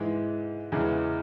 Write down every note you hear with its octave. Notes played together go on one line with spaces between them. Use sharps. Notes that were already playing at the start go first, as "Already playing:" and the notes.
Already playing: G#2 E3 G#3
E2 C#3 E3 G#3 G#4